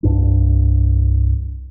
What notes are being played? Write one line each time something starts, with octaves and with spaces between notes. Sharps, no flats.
C2 G2 D4